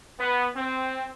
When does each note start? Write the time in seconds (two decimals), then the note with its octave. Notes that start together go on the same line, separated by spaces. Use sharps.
0.19 B3
0.56 C4